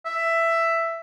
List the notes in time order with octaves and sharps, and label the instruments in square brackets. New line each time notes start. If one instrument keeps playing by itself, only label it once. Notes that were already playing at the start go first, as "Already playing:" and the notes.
[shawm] E5